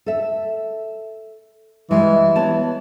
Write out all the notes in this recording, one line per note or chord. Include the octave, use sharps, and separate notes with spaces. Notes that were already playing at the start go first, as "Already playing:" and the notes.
A4 E5
E3 G3 G#3
B3 C#5 A5